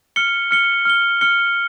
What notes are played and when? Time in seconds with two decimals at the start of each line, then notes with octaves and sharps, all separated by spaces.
0.16 F6 C#7 G7
0.51 F6 C#7 G7
0.85 F6 C#7 G7
1.21 F6 C#7 G7